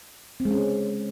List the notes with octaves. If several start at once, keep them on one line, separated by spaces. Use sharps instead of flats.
C4
G#3
C#4